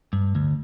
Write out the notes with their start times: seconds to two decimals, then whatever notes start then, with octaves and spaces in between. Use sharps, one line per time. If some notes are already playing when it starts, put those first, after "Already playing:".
0.13 G2
0.35 D2